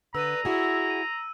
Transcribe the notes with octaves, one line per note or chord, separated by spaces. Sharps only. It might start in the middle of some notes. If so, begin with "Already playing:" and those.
D3 B4 A#5 E6 D#7
E4 F#4 G#4
D#7